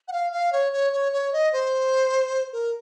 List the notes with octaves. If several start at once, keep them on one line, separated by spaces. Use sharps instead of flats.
F#5
F5
F5
C#5
C#5
C#5
C#5
D#5
C5
A#4